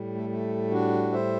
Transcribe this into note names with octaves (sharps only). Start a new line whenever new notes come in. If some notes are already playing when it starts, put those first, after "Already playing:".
Already playing: A2 G3
A3
A3
D4 F#4
C5 E5